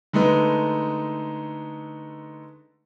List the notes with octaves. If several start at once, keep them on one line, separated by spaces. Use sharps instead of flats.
D3 G#3 A3 D#4 B4